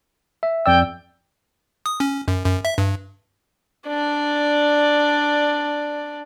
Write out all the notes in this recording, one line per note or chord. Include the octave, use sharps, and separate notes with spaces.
E5
F2 D5 G5 E6
D#6
C#4
F#2
F#2
E5
G2
D4 D5